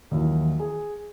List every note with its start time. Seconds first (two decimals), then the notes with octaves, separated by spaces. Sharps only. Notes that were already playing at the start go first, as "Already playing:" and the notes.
0.11 D#2 E3 F#3
0.60 G#4